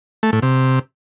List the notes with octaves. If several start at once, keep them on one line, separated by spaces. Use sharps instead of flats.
A3
A2
C3